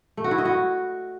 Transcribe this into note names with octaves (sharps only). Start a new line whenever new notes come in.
A3
F#4
E4
D#5
F#4